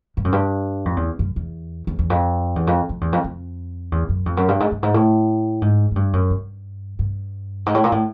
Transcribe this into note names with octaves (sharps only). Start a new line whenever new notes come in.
G2
F#2
G2
F2
E2
F#2
E2
E2
E2
F2
E2
F2
F2
E2
F2
F2
E2
F#2
F2
F#2
G2
G#2
G2
G#2
A2
G#2
G#2
G2
F#2
G2
G2
G#2
A2
A#2
A2